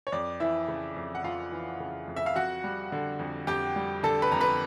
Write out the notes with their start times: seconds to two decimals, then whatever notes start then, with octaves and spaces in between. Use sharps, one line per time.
0.07 C#5
0.12 F2 D5
0.40 E3 E4 E5
0.68 C#3
0.96 F2
1.15 F#5
1.24 F2 F4 F5
1.52 E3
1.80 C#3
2.08 F2
2.16 E5
2.26 F5
2.36 F2 F#4 F#5
2.64 G3
2.92 D3
3.19 F2
3.47 F2 G4 G5
3.76 G3
4.03 D3 A4 A5
4.22 B4 B5
4.32 F2 A#5
4.40 B4 B5